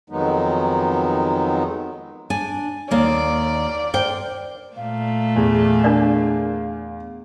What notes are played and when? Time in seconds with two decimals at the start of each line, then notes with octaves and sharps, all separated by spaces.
0.10 F2 D#3 F#3 G#3 B3 D#4
2.30 D4 G#5
2.91 D#2 A#3 C#5 D5
3.94 A#4 C5 G5
4.77 A#2 A3 F5
5.36 E2
5.84 D4 A#4 D5